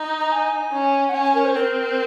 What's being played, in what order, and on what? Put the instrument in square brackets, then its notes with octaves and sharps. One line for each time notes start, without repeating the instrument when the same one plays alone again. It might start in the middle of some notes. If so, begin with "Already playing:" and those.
Already playing: [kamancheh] D#4
[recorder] A#5
G#5
[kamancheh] C#4
[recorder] F#5
[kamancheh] C#4 [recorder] G#5
[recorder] G#5
A#4
C5
[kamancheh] C4 [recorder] A#4